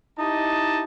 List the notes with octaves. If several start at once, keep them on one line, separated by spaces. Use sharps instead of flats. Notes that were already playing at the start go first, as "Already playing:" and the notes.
D#4 E4 G4 D#5 A5